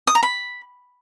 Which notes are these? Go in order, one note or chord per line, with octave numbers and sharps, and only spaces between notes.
D#6
A#5
B5